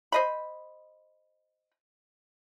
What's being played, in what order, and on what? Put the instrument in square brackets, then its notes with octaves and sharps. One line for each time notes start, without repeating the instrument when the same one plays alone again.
[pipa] C5 D#5 B5